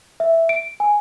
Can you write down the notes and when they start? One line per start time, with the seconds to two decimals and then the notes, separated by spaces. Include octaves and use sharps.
0.20 E5
0.49 D7
0.80 G#5